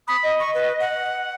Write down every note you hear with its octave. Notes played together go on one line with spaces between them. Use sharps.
B5 D#6
D#5
C#6
B4
F#5